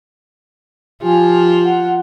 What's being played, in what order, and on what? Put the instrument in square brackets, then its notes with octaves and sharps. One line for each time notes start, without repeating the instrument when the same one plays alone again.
[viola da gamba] F3 F4 [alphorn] G4 [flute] G#5
[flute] F#5